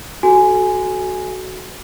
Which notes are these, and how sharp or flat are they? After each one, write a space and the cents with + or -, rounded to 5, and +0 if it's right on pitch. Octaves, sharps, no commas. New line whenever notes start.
F#4 +5 A4 -25 G#5 +0